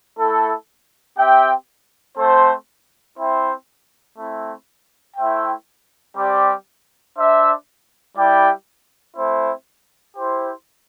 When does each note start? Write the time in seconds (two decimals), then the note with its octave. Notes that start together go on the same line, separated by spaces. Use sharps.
0.18 A3 E4 A4
1.17 C4 G4 E5 G5
2.17 A3 C4 A4 C5
3.18 C4 E4 C5 E5 G5
4.17 A3 C4 E4
5.17 A3 E4 C5 E5 G5
6.17 G3 C4 G4 D5 G5
7.16 D4 C5 E5
8.16 G3 E4 G4 D5 G5
9.16 A3 C4 E4 C5
10.16 E4 G4 C5